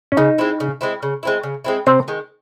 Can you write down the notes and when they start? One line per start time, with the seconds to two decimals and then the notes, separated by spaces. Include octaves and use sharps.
0.12 C#4
0.17 C#3 D#4
0.38 G#3 C4 E4
0.60 C#3
0.81 G#3 C4 E4
1.03 C#3
1.23 G#3 C4 E4
1.43 C#3
1.64 G#3 C4 E4
1.86 C3 C4
2.08 D#3 G#3